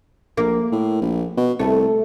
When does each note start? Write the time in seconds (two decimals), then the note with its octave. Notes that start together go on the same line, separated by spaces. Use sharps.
0.37 A#1 A#3
0.72 A2
1.02 A#1
1.37 B2
1.59 C2 A3